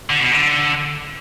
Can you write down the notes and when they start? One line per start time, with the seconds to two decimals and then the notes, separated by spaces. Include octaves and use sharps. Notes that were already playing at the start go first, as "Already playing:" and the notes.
0.10 D3
0.21 B2
0.32 D3